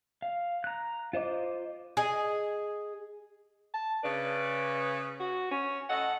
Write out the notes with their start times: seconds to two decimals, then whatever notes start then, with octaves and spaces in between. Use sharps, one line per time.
0.22 F5
0.64 A#5 F#6
1.13 F4 C5 D#5 D6
1.97 G#4 D#5
3.74 A5
4.04 C#3 B4 D5
5.20 F#4
5.51 C#4
5.90 A2 A4 D#5 F#5